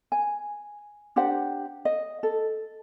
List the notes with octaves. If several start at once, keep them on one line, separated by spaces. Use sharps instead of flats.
G#5
D4 G4 C5 F#5
D#5
A4